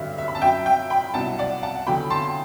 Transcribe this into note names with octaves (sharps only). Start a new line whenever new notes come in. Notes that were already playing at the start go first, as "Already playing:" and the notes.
Already playing: G2 D3 F#3 E5
E5
B5
A5
F#2 F#3 E5 G5
E5 G5
G5 B5
C2 B2 F#3 F#5 A5
D5 F#5
F#5 A5
E2 D3 F#3 G5 B5
A5 C6